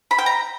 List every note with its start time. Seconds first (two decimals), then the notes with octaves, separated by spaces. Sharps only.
0.11 B5
0.19 G5
0.26 A#5